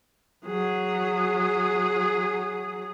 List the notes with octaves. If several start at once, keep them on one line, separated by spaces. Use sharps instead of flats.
F#3 G#4